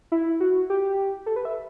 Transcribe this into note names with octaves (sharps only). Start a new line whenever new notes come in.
E4
F#4
G4
A4
B4
E5